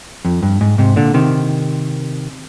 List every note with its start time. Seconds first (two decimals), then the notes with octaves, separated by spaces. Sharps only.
0.25 F2
0.43 G2
0.61 G#2
0.78 G#2 C3
0.96 A#2 D3
1.14 C3 D#3